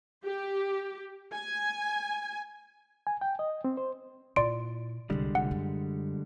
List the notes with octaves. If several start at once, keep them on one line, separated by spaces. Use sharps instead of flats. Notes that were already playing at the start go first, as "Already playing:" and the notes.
G4
G#5
G#5
G5
D#5
C4
C5
A#2 E4 D5 C6 D7
C2 F2 D3 G3 G#3
F1 F#5
F#2